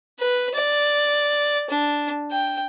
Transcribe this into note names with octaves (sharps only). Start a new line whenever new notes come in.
B4
D5
D4
G5